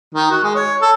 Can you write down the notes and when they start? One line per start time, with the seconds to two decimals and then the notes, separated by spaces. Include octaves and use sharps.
0.15 D#3
0.31 F#4
0.44 G#3
0.55 C#5
0.82 A4